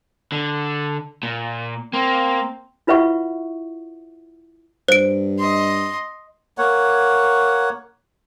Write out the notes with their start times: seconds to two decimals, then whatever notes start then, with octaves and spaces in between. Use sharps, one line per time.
0.32 D3
1.23 A#2
1.93 A#3 C4
2.87 E4 F4 B4 E5 F#5 C#6
4.88 G2 C5 D7
5.40 D#5 C6
6.58 A#3 C#5 F#5